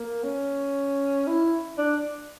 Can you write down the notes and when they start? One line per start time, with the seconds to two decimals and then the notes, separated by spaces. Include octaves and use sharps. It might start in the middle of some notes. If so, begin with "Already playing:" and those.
Already playing: A#3
0.24 C#4
1.27 E4
1.78 D4